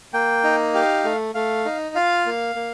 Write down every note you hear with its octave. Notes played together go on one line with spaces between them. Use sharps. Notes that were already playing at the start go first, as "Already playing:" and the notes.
A#3 G5
D#4
G4 F5
A3
A3 F5
D#4
F4 F5
A#3
A#3